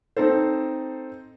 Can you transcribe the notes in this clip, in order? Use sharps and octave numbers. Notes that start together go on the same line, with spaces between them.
C4 D#4 A4 C5